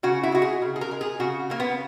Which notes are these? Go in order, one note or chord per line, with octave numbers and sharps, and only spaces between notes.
C#3 F#4
E4
G#3 F#4
G#4
C#3
G#4
A#4
G#3
G#4
C#3 F#4
C#3 A#3
B3